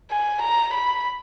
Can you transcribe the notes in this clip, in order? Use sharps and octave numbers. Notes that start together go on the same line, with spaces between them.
G#5
A#5
B5